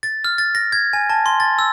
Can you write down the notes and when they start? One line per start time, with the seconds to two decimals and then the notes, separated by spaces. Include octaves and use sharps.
0.03 A6
0.24 F6
0.38 A6
0.55 A#6
0.72 G#6
0.93 G#5
1.10 A5
1.26 C6
1.40 A6
1.59 E6